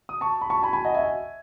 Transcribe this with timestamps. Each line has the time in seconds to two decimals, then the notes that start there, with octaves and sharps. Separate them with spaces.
0.09 D#6
0.21 A5 C#6
0.41 B5
0.50 A5 C#6
0.63 G#5 B5
0.73 G#5 B5
0.85 D#5 F#5
0.95 E5 G#5